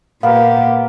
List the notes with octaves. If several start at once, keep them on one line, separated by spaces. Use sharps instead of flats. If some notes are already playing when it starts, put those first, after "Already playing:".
A#2 A#3 B3 G4 F5